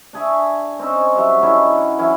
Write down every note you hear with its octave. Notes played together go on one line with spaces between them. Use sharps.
D4 G#4 E5 C#6
C4 C#4 D#4 C5
F#3 G3 E5
D3 C#4 D#4 E4
F#5
E3 F#3 C#4 E4